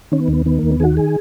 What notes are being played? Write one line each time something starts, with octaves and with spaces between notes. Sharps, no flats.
D#3 C#4
B3
D#2
B3
D#3 B3
D#2 A#3
B3
D#3 F#4 G#4
G#4